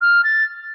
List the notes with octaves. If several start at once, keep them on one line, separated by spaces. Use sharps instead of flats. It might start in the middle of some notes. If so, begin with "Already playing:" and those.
F6
A6